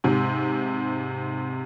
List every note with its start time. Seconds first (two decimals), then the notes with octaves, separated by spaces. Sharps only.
0.04 G#2 C3